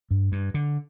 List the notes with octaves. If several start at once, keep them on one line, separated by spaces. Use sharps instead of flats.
G2
G2
D3